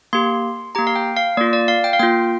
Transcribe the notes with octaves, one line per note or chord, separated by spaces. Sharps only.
A#3 G4 C6
A#3 G4 A#5
F5
G5
F5
A#3 F4 D5
D5
F5
G5
F5
A#3 F4 G5